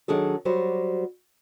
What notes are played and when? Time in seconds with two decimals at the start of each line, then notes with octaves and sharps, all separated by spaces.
0.08 D#3 F#3 D4 G#4 A4
0.45 F#3 G3 F#4 C5